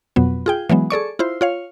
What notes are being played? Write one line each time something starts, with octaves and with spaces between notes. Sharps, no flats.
F2 B2 F#3 B3
F4 G#4 G5
E3 F#3 G#3 B3
G#4 A4 D5 C#6
E4 F4 C5
F4 C#5 F5